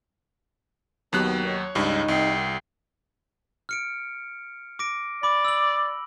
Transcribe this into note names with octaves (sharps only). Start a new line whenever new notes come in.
D#2 B2 D#3 F#3 B3 G4 F#6
C#5
C#2 G2 D#4
C2 G5 C7
F6 C#7 D7
D6 A#6 D7
D5 B5 D6
E6 F#7